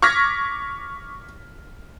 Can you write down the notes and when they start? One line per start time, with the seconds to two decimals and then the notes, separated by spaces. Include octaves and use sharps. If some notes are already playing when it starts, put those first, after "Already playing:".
0.02 C#6 D6 F6 G#6 A#6 B6